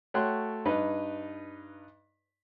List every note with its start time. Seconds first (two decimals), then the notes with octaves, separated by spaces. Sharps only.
0.14 A3 F#4 C#5 G5 C6 F#6
0.65 G2 D#4 B4 D#5